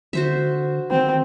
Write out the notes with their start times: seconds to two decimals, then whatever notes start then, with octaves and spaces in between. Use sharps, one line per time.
0.13 D3 F#4 C5 E5
0.91 D#3 C4